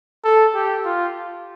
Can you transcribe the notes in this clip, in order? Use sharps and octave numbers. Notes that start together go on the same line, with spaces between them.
A4
G4
F4